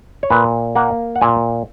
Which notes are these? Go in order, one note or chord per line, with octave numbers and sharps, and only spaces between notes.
C#5
A#2 B4
A#3 F#5
F#5
A#2 G#5